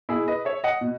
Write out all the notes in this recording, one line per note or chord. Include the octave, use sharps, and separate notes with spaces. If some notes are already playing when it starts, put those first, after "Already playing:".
B2 E4 G#4
B4 D#5
C#5 E5
D#5 F#5
B2